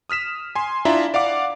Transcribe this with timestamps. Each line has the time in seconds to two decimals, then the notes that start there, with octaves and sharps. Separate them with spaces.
0.10 D#6 F6 B6 E7
0.55 G#5 C6
0.85 D4 E4 F4 E5 A#5
1.14 D5 F5 F#5 D6